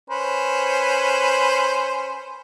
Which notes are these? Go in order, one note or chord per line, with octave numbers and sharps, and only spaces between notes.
C#4 B4 C5